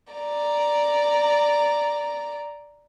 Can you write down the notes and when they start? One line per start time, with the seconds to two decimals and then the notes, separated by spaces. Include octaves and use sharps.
0.13 D5 A#5